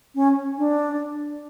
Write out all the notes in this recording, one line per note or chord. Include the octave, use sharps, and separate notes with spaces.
C#4
D4